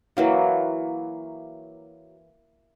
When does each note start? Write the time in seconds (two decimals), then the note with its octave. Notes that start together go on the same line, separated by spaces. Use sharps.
0.17 E3 F#3 A#3